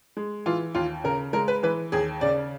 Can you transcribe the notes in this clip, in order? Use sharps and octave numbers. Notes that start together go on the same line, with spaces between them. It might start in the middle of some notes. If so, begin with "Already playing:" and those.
G#3
E3 F4
D#2 F4
C#3 A#4
G#3 A#4
B4
E3 B4
D#2 G#4
C#3 D5